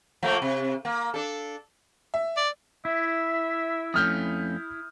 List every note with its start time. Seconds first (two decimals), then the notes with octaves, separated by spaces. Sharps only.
0.23 F3 A3 A#3
0.42 C3
0.85 A#3
1.14 D4 A4
2.14 E5
2.37 D5
2.85 E4 E5
3.94 F2 A3 C#4 D#6 F6 G6